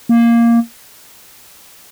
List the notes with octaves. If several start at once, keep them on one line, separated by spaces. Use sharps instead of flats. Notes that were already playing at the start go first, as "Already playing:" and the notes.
A#3